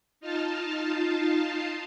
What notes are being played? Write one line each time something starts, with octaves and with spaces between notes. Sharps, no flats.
D#4 F4 F5 A5